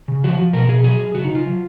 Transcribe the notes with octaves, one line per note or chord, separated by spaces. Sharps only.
C#3
F3 F#4
F3
B2 A#4
B2 G#4
F#3 G#4
F#3
C#3 F#4
D#4
C#3
F4
F#3